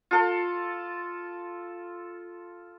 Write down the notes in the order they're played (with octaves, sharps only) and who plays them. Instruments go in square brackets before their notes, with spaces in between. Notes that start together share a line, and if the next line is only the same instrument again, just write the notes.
[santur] F4 A4